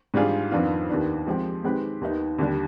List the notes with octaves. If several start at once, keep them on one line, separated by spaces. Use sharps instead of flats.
G#2 G3 D4 F4 G#4
F2 D#3 B3 D4 F4
D#2 D#3 B3 D4
F3 G#3 C4 G4
D#3 G#3 C4 G4 B4
D#2 D#3 B3 D#4
D#2 D3 G3